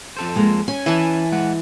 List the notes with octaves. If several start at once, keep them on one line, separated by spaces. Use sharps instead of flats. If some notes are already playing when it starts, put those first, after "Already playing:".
F2 A4 C5
G#3 A#3
C#4 G#5
E3 E5 G#5 A5 B5
G#3 F#5